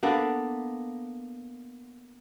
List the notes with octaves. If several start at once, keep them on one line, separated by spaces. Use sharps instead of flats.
A#3 B3 D4 A4